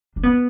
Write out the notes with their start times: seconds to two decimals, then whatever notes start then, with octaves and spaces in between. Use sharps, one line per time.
0.16 D4
0.23 B3